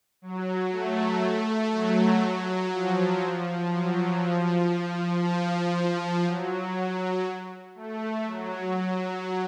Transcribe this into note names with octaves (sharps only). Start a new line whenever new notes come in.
F#3
A3
F#3
F3
F#3
F3
F3
F#3
A3
F#3